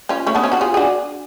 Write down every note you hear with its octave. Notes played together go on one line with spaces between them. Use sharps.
C#4 F4
A3 C#4
B3 D4
C#4 F4
D4 F#4
F4 G#4
G#4
D4 F#4